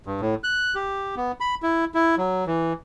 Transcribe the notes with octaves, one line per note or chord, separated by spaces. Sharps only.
G2
A2
F#6
G4
B3
B5
E4
E4
F#3
E3